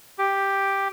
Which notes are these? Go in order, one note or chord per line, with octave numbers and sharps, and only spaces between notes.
G4